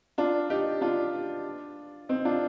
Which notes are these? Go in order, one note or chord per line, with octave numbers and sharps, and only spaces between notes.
D4 F4
D#4 G4
D4 F4
C4 D#4
D4 F4